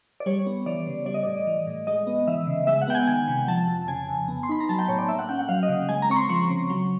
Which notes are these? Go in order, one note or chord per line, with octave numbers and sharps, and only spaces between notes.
D5
G3 C#5
B3
E3 D5
C#3
G3 D5
D#5
A2 D5
E3
A2
G#3 D#5
B3
E3 E5
C#3
G#3 E5
F#5
B3 G5
G#5
D#3 G#5
C3
F3 A5
F2
C#3 G#5
F2
B3
C6
D#4 B5
A#5
F#3 A5
G5
A2 C#5
D5
A#3 E5
F#5
C#4 G5
F#5
F#3 F5
D#5
C#3
G#3 G#5
A#5
C4 C#6
C6
F3 C#6
C#3
F#3